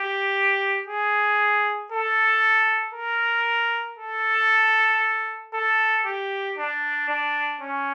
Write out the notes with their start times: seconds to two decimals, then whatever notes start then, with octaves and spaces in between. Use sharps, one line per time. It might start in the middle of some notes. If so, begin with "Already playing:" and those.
Already playing: G4
0.87 G#4
1.92 A4
2.94 A#4
3.99 A4
5.54 A4
6.06 G4
6.58 D4
7.09 D4
7.61 C#4